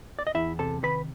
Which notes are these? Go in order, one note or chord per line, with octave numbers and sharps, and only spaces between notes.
D5
D#5
E2 E4 E5
C3 A4 A5
D#3 B4 B5